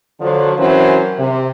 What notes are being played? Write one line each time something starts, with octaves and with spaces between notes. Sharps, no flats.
D3 F3 F#3
E3 F#3 C4 C#4 A#4 C5
C3